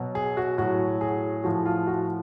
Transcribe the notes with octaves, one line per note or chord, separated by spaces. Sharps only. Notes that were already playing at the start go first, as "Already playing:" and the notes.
Already playing: B2 F#3
G#4
F#4
A2 F#3 F#4
G#4
A2 F3 F#4
F4
F#4